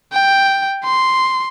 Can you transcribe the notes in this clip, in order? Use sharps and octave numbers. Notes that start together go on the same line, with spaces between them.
G5
C6